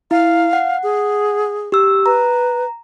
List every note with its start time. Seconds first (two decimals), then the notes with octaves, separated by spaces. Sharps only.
0.11 E4 F5
0.53 F#5
0.83 G#4
1.72 G4 E6
2.06 B4 A#5